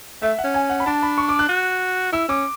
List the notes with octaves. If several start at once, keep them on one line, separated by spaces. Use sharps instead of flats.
A3 E5
F#5
C#4
G#5
F#5
B5
D4 A5
B5
C#6
D6
F#6
F#4
E4 E6
C#4 D6